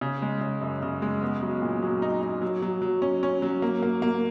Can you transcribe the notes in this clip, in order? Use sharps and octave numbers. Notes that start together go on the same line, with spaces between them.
C#3
G#3
C#3
F#2
C#3
G#3
B3
F#3
A#2
F#3
D#4
D#4
F#3
F#3
F#3
C#4
C#4
F#3
A#3
A#3
A#3